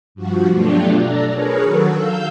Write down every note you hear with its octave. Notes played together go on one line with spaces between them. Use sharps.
G2 F3 F#4
B2 F#3 A3 D4 F4 G4
D4 A4 A#5
G#4 A#4 B4 C#5
D#3 F#3 F#4 A4
F5 E6 G6